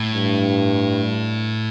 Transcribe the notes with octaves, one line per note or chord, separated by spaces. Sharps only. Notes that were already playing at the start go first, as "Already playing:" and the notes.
Already playing: A2
G2